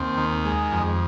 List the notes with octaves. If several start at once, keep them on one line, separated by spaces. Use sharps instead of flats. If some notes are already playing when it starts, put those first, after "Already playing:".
Already playing: D#2 C4
D#3
G#3
F2